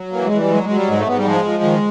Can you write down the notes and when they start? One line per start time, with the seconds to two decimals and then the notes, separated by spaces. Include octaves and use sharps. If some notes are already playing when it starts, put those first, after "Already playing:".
Already playing: F#3
0.12 E3 A#3
0.25 G#3
0.32 E3
0.38 G3
0.50 F#3 G#3
0.63 G#3
0.69 F#3
0.75 G3
0.88 G#2 G#3
0.98 A3
1.07 G#2 B3
1.17 G3
1.26 F3 G#3
1.45 F3
1.63 D#3